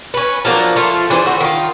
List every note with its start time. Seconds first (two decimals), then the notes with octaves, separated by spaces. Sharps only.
0.14 C#4 B4
0.45 F3 F#3 A#3 D4
0.76 F3 A3 F4
1.10 E3 D4 G#4 C5
1.26 A3 F#4
1.40 D#3 F4